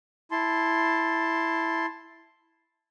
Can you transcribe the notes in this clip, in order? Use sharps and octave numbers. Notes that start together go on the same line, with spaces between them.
E4 A5 C6